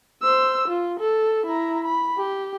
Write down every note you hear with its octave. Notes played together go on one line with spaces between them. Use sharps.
C5 E6
F4
A4
E4 A#5
B5
G4